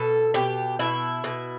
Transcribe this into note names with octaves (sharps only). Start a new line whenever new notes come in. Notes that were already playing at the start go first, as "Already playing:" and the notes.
Already playing: B2 A4
B2 G4
B2 E4
B2